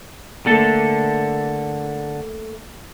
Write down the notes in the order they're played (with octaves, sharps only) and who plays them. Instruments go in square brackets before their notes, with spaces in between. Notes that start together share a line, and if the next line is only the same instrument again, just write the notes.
[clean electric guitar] D3 A4 A5 [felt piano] A3 A#3